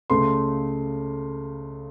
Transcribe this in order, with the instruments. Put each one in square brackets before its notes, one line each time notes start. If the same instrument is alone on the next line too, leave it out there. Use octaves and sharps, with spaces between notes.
[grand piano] C#2 C#3 A3 C6